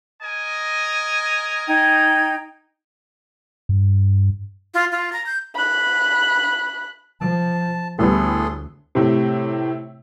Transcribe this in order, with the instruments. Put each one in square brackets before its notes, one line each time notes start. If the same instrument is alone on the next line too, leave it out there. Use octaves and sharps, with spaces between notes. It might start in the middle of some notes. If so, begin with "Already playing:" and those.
[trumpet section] A#4 D#5 G#5
[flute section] D#4 G5 G#6
[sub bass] G2
[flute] F4
F4
A#5
G6
[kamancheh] B5 F#6
[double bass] F3 [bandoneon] A5
[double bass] D2 [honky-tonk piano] A2 G3 B3 [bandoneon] G#4 A4 C6
[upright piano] A2 C3